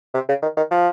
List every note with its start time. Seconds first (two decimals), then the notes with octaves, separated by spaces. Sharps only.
0.14 C3
0.29 C#3
0.43 D#3
0.57 D#3
0.71 F3